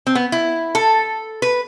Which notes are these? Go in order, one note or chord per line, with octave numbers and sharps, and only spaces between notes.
C4
B3
E4
A4
B4